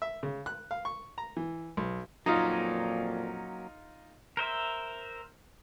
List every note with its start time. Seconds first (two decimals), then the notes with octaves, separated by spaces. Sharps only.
0.02 E5
0.23 C#3
0.46 F#6
0.71 F5
0.85 C#6
1.18 A#5
1.37 E3
1.77 B1
2.26 F2 A#2 F#3 A#3 C#4 D#4 F4
4.37 A#4 C5 E5